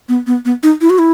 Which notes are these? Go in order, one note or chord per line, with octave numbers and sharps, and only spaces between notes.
B3
B3
B3
D#4
E4
F#4
E4